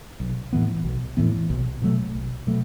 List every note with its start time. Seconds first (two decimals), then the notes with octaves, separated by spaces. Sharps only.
0.20 B1
0.53 A2 E3 B3
0.84 B1
1.17 A2 E3 B3
1.50 B1
1.82 B2 F#3 A3
2.15 B1
2.47 B2 F#3 A3